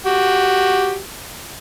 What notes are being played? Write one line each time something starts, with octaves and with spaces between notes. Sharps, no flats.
F#4 G4